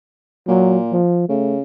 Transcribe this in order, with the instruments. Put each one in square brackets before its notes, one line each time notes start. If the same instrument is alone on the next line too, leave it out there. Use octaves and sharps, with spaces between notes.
[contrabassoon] A#2 [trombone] F#3
[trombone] F3
[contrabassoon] C#3 [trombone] A3